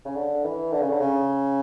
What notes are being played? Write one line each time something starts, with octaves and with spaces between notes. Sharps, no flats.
C#3
D3
E3
D3
C#3
D3
C#3